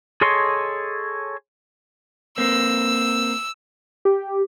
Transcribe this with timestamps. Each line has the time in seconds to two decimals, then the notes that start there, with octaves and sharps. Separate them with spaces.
0.21 G#4 A4 C#5 D#5 C6
2.38 A#3 C4 E6
4.05 G4